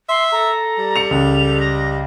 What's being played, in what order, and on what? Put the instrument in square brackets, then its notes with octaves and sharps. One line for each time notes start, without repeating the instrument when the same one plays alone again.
[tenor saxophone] E5 [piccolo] C6
[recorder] A4 [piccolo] A#5
[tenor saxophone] G3
[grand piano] C#7 F7
[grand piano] C#2 [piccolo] F7
[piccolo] A#6